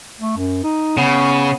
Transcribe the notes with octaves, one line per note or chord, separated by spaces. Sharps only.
A3
F#2
D#4
C#3 B3